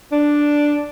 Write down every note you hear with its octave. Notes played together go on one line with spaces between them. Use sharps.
D4